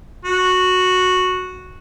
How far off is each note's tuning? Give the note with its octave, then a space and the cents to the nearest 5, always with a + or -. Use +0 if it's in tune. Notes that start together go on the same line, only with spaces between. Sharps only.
F#4 -5